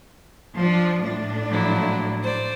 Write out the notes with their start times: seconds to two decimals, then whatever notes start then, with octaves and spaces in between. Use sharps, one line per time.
0.58 F3 D4
1.03 A2 D4
1.48 F3 F#3 E4
2.22 C5 D5